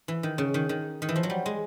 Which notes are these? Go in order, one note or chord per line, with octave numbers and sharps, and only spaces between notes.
E3
D#3
C#3
D#3
D#3
D#3
E3
F3
F#3
G3
G#3